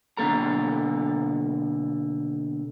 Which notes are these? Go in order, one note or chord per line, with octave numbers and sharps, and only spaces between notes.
B2 D3 A#3 A4 A#5